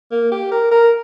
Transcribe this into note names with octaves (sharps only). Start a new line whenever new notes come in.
A#3
G4
A#4
A#4